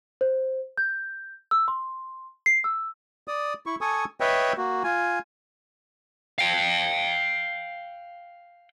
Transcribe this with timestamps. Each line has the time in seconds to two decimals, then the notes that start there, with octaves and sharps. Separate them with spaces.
0.21 C5
0.77 G6
1.51 E6
1.68 C6
2.46 C7
2.64 E6
3.28 D5 D#6
3.66 E4 C#6
3.81 A4 G#5 C#6 D#6
4.20 B4 C#5 D#5 E5 G5
4.57 A#3 F#4
4.84 F4 G#5
6.38 F5 G5